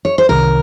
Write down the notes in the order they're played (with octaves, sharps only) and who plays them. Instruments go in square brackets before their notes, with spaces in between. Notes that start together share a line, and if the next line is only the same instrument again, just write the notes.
[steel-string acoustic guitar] C#5
C5
[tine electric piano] C2 C3 D#3 [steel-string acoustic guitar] A#4